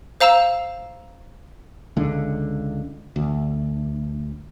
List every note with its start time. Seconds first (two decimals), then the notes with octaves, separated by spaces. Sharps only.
0.20 C5 F5 A#5 E6 E7
1.97 C#2 D3
3.16 D2